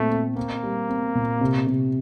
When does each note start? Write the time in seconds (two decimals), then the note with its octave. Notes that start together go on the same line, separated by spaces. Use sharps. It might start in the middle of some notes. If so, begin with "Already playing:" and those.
Already playing: A#2 A3 C4
0.11 C4
0.36 A#3 C4
0.63 G3
0.89 C4
1.15 A#2
1.41 C3
1.67 C3